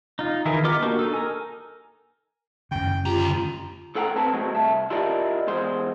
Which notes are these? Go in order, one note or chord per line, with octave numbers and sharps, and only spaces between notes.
D#4 F4
D#3 E3 E4 G#4 A#4
B3 F4 D#5 D6 F6
A#3 D4 F#4 G4 A#4
D#4 A4
A#4 G#5
F#2 C#3 G5
D2 F4 G4 A#5
A2 A4 F#5 G5 A5 A#5
C4 B4 A5
F#3 G#3 A3 C4
C2 E5 A5
E4 F4 G4 A#4 D5 D#5
E2 G#3 C5